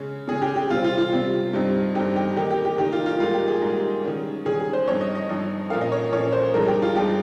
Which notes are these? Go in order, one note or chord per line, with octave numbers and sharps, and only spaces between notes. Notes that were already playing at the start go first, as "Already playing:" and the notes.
Already playing: C#3 G#3 C#4
C#3 G#3 C#4 G#4
G4
G4
C3 G3 C4 F4
F4
F4
C3 G3 C4
G2 G3 C4 D#4
G2 G3 C4 D#4 G4
G4
D#3 A#3 D#4 G4
G4
G4
D#3 A#3 D#4 G4
F4
F4
G#2 G3 A#3 D#4 F4
G4
G#4
G#2 G3 A#3 D#4
D#3 G3 C#4
D#3 G3 C#4 G#4
G#4
C5
G2 F3 C4 D#4 C#5
D#5
D#5
G2 F3 C4 D#4
A#2 F3 A#3 C#4 F5
D#5
C#5
A#2 F3 A#3 C#4 C#5
C5
G2 F3 G#3 D#4 A#4
G4
F4
G2 F3 G#3 D#4 G4